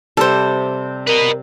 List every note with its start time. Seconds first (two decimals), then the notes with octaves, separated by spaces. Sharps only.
0.17 C3 G3 A4 C5
1.07 A#4 B4 D#5